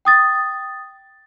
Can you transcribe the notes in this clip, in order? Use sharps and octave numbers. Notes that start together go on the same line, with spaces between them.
G5 D#6 A6